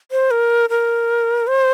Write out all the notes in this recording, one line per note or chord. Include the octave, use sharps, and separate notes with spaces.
C5
A#4
A#4
C5